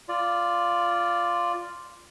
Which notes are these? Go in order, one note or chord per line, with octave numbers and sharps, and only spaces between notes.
F4 D5